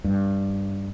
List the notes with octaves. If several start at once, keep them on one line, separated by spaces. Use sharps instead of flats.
G2